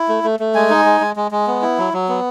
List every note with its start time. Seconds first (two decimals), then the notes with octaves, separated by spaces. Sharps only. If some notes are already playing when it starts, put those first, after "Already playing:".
Already playing: E4
0.08 A3
0.24 A3
0.40 A3
0.55 G#3 G#5
0.70 D#4
0.85 G#3
1.01 G#3
1.16 G#3
1.31 G#3
1.47 B3
1.62 E4
1.78 F#3
1.93 F#3
2.09 B3